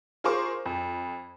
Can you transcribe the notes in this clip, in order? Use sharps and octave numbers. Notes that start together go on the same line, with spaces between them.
F4 G#4 A#4 C5 C#6 D6
F2